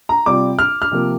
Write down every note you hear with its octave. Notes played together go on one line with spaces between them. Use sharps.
A#5
C3 G3 C4 F4 D6
F6
F6
C3 F3 A#3